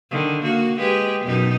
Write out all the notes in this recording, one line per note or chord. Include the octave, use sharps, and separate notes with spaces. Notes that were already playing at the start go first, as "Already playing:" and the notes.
D3 D#3
A#3 F#4
G#3 G4 B4
F#2 B2 D#4